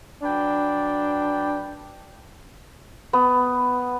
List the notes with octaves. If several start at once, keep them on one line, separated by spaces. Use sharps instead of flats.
F#3 D4 B4 G5
B3